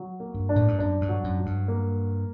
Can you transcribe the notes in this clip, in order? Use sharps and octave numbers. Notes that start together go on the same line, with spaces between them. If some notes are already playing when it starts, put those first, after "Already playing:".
Already playing: F#3
A#3
G2
D4
A2
G2
F#2 D4
G2
F#3
F#2
F#3
G2
A#3